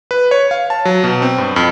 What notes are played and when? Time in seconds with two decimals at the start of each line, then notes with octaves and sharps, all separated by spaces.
0.11 B4
0.31 C#5
0.51 F5
0.70 A5
0.85 F#3
1.04 B2
1.22 C4
1.38 G2
1.56 F2